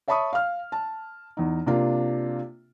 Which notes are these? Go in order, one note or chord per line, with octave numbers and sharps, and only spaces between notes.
C#5 E5 A5 B5 C#6 D#6
F5 F6
A5
E2 D#4
C3 A#3 D4 F4